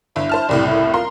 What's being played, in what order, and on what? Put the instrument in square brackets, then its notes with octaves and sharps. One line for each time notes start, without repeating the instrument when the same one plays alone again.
[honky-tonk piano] G1 [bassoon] E4
[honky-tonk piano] C5 A5 F6
[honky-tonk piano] F#1 C2 A2 [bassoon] G3
[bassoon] E4
[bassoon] F4 [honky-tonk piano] A#4 C6